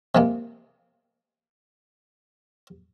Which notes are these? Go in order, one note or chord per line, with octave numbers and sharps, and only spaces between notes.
C3 G#3 A#3